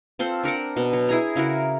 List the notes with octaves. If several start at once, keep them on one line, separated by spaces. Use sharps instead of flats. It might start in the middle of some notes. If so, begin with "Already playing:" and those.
C4 F4 A4 C5
D4 A#4 F#5 D6
B2
F#3
E4 G#4 A#5
C#3 E4 F#4 A#4